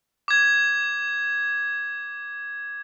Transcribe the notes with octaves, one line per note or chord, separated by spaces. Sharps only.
D6 G#6